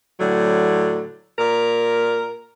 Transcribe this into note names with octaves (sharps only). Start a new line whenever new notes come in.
A2 D3 F#3
A#2 A#4